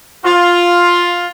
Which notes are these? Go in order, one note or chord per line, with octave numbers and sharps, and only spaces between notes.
F4